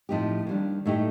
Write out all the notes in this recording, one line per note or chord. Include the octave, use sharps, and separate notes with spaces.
A2 F3 C4 D#4 G4
D#2 D#3 G3 D4
A2 A3 D#4 G4